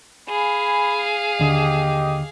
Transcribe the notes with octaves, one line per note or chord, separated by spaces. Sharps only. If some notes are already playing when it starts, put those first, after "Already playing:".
G#4 F5 G#5 B5
D#2 D3 G4 D#5